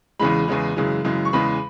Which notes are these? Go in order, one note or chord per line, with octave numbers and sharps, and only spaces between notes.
E2 C#3 E3 G#3 B5
E2 C#3 E3 G#3
F#2 C#3 E3 G#3
F#2 C#3 E3 G#3
C#6
E2 C#3 E3 G#3 B5